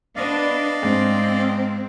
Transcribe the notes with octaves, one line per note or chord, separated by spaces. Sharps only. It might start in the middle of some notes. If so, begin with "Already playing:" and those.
B3 D4 D5 D#5 F5
G#2 C4